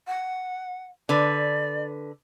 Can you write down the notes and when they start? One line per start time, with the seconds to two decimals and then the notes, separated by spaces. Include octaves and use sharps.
0.08 F#5
1.09 D3 B4 D5